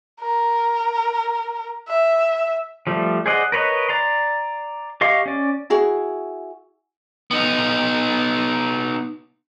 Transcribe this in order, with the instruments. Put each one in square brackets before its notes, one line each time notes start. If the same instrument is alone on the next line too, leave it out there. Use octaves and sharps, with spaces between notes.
[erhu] A#4
E5
[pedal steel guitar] F3 G3 A3
G#4 C5 D5 D#5 F#5
A#4 B4 C#5 D#5
D5 A#5 C6
G4 D#5 F5 C#6
C#4 D5
[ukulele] E4 F#4 G#4
[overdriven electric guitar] B3 D#4